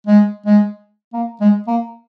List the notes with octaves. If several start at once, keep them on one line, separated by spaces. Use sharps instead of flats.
G#3
G#3
A#3
G#3
A#3